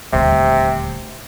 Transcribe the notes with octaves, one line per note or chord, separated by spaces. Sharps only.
D#1 D2 C3